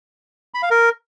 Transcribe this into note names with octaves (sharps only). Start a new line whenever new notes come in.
B5
F5
A#4